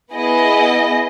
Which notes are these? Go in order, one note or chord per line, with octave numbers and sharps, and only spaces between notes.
B3 E4 G#4 D#5